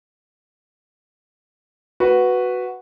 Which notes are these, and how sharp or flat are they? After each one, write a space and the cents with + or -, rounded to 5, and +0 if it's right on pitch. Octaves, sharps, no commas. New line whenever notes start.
F#4 +0 B4 +0